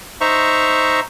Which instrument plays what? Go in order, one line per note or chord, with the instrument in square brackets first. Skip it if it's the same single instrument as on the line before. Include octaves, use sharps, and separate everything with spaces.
[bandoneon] D#4 C5 E5 A#5 C#6